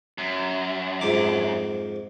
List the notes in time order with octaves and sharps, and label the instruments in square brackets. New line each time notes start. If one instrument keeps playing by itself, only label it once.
[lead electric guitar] F#2
[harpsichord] F2 G#2 D6